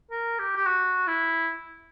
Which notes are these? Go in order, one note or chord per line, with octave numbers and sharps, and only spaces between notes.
A#4
G4
G4
F#4
E4